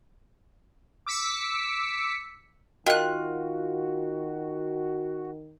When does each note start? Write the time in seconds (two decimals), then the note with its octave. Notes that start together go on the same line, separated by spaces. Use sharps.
1.07 D6 E6 B6 C#7
2.86 D#3 F4 F#4 A#4 D#5 G5 F#6